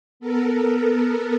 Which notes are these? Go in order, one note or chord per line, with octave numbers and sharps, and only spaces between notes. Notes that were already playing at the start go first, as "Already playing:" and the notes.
B3 A4 A#4